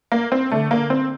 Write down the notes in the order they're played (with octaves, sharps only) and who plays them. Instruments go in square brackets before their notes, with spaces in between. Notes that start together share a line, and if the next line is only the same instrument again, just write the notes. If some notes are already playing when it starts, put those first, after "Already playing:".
[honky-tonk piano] A#3
C4
[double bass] D3 [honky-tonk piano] A3
[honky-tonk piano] A#3
C4